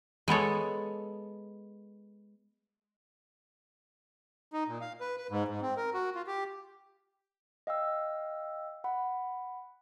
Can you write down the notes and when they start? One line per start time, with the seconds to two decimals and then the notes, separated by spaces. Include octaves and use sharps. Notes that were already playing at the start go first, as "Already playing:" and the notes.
0.28 G#3 B3 A4 C#5
4.53 D#4
4.68 A#2
4.81 F5
5.00 B4
5.17 B4
5.30 G#2
5.48 G#2
5.62 C4
5.77 A#4
5.94 F#4
6.15 F4
6.27 G4
7.67 D#5 F5 G5 E6
8.84 F#5 B5